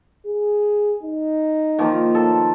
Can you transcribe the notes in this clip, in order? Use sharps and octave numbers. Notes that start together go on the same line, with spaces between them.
G#4
D#4
D#3 F3 A#3
A2 A4